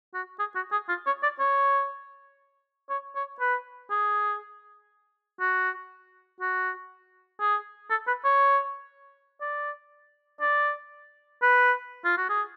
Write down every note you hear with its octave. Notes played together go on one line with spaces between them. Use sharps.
F#4
G#4
F#4
G#4
F4
C#5
D5
C#5
C#5
C#5
B4
G#4
F#4
F#4
G#4
A4
B4
C#5
D5
D5
B4
F4
F#4
G#4